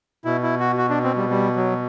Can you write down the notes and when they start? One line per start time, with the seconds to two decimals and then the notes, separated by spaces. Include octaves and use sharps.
0.25 B2 E4
0.43 E4
0.60 F#4
0.77 F#4
0.90 D4
1.03 C4
1.16 G3
1.30 G3
1.56 F#3